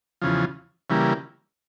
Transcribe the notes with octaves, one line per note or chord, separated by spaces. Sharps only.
E2 C#3 F3
C#3 E3 G3 A#3